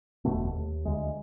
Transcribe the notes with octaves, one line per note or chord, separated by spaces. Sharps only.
E1 D2 B2 A3
D#2
D2 G#3